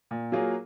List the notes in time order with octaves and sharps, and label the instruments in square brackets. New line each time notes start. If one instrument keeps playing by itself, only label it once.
[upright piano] A#2
F#3 A#3 F4 G#4